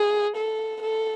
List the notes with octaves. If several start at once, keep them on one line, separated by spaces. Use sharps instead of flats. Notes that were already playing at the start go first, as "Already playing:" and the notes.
Already playing: G#4
A4
A4